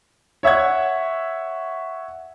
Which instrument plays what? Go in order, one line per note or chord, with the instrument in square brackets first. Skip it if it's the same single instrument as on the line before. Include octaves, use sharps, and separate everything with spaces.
[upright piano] C#5 E5 F#5 G#6